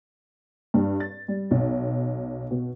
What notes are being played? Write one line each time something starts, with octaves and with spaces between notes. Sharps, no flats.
G2
A6
G3
B1
B2